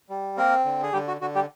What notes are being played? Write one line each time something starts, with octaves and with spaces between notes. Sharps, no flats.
G3
A#3 C4 A#4
D3
G#4
D3 G3 G4
F#4
D3 F#4
G3 G4